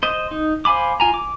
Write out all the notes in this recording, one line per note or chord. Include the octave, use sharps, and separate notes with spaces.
C5 D#5
D#4
C5 F5 G#5 B5 D6
F4 G#5 A#5
D6